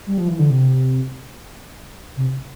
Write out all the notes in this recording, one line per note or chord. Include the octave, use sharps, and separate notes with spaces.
G3
F3
E3
D3
C3
C3